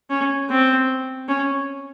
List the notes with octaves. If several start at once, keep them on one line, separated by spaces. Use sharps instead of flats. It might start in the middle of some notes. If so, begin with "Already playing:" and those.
C#4
C4
C#4